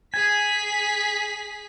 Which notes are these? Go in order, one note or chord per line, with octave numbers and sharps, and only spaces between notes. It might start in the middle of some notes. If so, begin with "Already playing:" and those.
G#4 G#5 B6